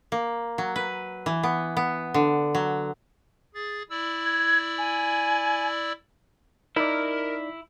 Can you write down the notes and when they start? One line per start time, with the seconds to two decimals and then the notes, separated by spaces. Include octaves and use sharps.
0.12 A#3
0.58 F#3
0.76 B4
1.26 E3
1.43 B3
1.77 B3
2.14 D3
2.55 F#3
3.55 G#4 A6
3.90 E4 D5 E6
4.25 G#6
4.78 G#5
6.76 D#4 E4 A#4 D5